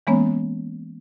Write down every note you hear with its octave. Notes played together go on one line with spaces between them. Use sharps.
E3 G#3 A#3 B3 C#4 C#5